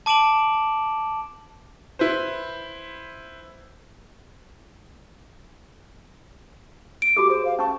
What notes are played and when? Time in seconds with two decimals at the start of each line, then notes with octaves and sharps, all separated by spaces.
0.06 A5 D6 D7 E7 F#7
1.99 E4 B4 C5
7.02 D7
7.17 F#4 G4 A4 D6
7.30 G#4 C5
7.45 F5
7.59 C#4 A5 C#6